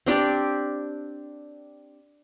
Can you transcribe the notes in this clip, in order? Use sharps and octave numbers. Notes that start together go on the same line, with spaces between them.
C4 D4 G4 D5